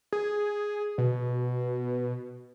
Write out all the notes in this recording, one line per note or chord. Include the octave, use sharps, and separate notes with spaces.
G#4
B2